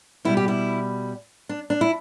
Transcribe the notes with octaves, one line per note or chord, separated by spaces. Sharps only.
B2 G3 E4
G4
E4
D4
D4
E4